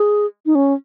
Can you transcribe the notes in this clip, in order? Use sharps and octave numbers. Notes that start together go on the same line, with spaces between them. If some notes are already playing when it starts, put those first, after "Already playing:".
Already playing: G#4
D#4
C#4